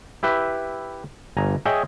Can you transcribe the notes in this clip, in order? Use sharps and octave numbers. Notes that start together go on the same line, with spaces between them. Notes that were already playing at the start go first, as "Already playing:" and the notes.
E4 G4 B4 E5
G1 G#5 A#5
G#4 C#5 D#5 E5 G5 G#5